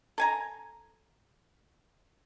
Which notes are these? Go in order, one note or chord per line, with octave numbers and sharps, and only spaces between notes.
A4 G#5 A#5